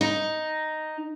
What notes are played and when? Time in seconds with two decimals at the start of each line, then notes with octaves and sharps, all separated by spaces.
0.01 D#4